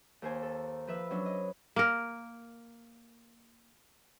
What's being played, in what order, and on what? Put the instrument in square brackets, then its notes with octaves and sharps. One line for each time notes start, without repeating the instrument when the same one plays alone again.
[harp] D#2 C5 G#5
A4
F3 B4 E5
F#3 C#4 D4
D#5
[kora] A#3 A#4